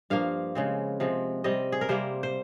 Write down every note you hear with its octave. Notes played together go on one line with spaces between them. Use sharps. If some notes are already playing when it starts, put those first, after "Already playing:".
G2 F3 A#3 F5
C#3 G#3 C4
C3 F3 G#3 C4
C3 G3 C4 D#5
G#4
A#4
C3 G3 A#3 C5
C5